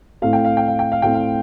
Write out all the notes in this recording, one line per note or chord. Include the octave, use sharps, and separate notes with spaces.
A2 A3 C4 F5
G5
F5
G5
F5
G5
F5
A2 A3 C4 G5
F5